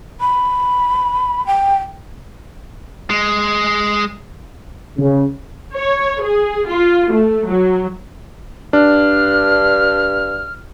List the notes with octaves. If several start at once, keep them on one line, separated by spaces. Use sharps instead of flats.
B5
G5
G#3
C#3
C#5
G#4
F4
A3
F#3
G2 D4 F6